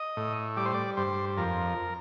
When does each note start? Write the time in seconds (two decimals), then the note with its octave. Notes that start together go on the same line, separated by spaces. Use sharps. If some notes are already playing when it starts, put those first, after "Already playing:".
Already playing: D#5
0.17 A2
0.57 G3 D5
0.66 C5
0.74 D5
0.97 G2 C5
1.37 F2 A#4